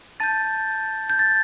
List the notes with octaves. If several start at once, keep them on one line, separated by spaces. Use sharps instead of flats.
A5 G6 A6
G6
A6